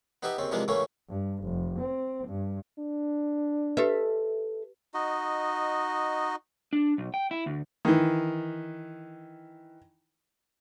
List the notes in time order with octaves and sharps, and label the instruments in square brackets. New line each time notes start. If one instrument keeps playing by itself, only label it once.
[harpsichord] B3 D#4 G4 B4 E5
D#2 C#3 C4
C3 E3 F3 G#3 A#3 D4
A2 C#3 E3 A3 A#3 C#4
[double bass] G2
F1
C4
G2
[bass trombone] D4
[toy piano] G4 B4 [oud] A4 E5
[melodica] D#4 F#4 D#5
[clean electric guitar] D4
B1
G5
E4
D2
[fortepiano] D#3 E3